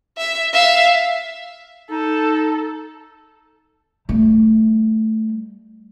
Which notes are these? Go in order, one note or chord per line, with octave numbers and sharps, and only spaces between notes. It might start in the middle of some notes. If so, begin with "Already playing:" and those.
E5
E5 F5
D#4 A4
G3 A3